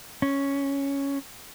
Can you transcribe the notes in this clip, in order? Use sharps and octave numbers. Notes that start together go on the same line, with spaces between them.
C#4